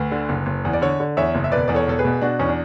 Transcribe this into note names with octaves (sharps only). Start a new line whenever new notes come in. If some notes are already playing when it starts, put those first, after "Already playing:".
Already playing: D2 B4
D3
F#1
F#1
E2
D5
D3 A4 C#5
D3
E2 C#5 E5
F#1
E5
E1 B4 D5
E2 D5
A4 C#5
E1 A4
G#4 B4
B2
B2 D4 F#4
E2 C#4
D4